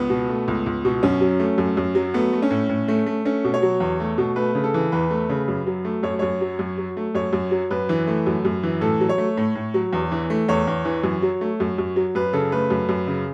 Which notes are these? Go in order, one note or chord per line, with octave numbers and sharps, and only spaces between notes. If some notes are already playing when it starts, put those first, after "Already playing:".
Already playing: C#2 B3
B2
A3
C#2
C#2
B2
F#2 C#4
F#3
A3
F#2
F#2
F#3
A3 B3
A3
C#4
A2
A2
A3
A3
A3 C#4
B2
C#5
F#3
E2
A3
B2
A3 B4
C#3
A4
E3
E2 B4
A3
C#3
F#2
F#3
A3
F#2 C#5
F#2 C#5
F#3
F#2
F#3
A3
F#2 C#5
F#2
F#3
F#2 B4
E3
A3
F#2
F#2
E3
A2 A4
F#3
C#5
A3
A2
A2
F#3
E2
E3
A3
E2 C#5
E2
E3
F#2
F#3
A3
F#2
F#2
F#3
F#2 B4
C#3 A4
A3 B4
F#2
F#2
C#3